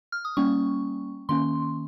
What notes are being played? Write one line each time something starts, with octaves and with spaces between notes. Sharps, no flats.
F6
D#6
G3 A#3 C#4 C#6
D#3 A#3 C#4 C6